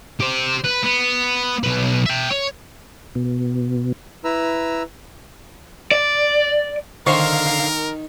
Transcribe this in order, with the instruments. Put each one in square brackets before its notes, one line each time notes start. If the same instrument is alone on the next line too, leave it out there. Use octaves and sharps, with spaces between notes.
[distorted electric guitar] G4 C5
B4
B3
B1 B4
E5 G5
C#5
[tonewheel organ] B2
[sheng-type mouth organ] E4 B4 A#5 E6
[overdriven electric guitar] D5
[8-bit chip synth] D3 F5 C7 [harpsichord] D#3 [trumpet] A#4 [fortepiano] C5 C#6